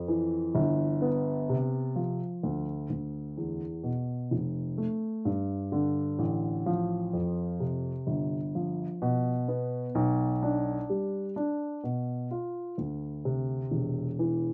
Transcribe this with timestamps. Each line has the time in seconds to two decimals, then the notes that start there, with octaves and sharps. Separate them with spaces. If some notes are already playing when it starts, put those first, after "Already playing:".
Already playing: F2
0.08 E3
0.55 G1
1.02 B3
1.49 C3
1.96 F3
2.43 D2
2.90 D2
3.37 E2
3.83 B2
4.31 F1
4.78 A3
5.25 G2
5.72 D3
6.19 A1
6.66 F3
7.13 F2
7.60 C3
8.07 G1
8.55 F3
9.02 B2
9.48 B3
9.95 B1
10.43 D4
10.90 G3
11.36 D4
11.84 B2
12.31 F4
12.78 D2
13.25 C3
13.71 E1
14.19 E3